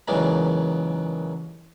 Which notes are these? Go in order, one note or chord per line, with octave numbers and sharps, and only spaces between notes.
D#2 A#2 C#3 E3 F#3 G#3